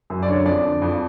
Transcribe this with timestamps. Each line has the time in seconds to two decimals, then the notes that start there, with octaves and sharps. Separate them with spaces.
0.10 F#2
0.23 D5
0.28 D3 C#5
0.46 F2 D5
0.64 D3
0.82 F2